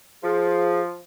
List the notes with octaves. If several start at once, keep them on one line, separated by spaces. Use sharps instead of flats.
F3 G#4